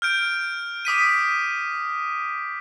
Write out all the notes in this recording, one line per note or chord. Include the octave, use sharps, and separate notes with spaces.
F6 G6 D7
D6 D#6 B6 D#7